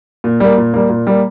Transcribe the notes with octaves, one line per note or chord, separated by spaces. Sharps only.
A#2
G3 A#3
A#2
G3 A#3
A#2
G3 A#3